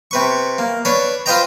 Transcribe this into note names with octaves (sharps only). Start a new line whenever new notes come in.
C3 B4 C#6
A#3
D4 B4 C#5
F4 B4 C5 D#5 G5 A#5